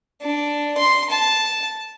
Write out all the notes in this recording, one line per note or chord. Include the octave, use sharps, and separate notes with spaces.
D4
C6
A5